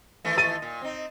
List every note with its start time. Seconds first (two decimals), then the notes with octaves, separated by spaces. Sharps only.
0.25 D#3 E3 A3
0.38 A6 D#7
0.62 A#2
0.82 C4 D#4